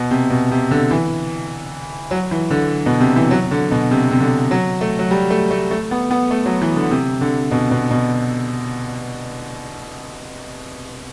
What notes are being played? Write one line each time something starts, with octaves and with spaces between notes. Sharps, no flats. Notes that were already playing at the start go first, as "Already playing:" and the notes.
Already playing: B2
C3
B2
C3
D3
E3
F#3
E3
D3
B2
C3
E3
F#3
D3
B2
C3
C3
D3
F#3
A3
F#3
G3
A3
A3
A3
B3
B3
A3
F#3
E3
D3
C3
D3
B2
B2
B2